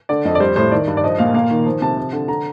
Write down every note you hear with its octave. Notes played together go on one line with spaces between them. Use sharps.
D3 D5
F2 D#5
D5
G3 C5
A2 C5
D#3 D5
G2
D5
F3 D#5
A#2 F5
A#3 F5
D#3
F3
C3 A5
F3
D3
D3 A#5